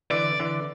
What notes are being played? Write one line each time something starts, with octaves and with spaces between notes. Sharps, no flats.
D3 E3 D5
D3 E3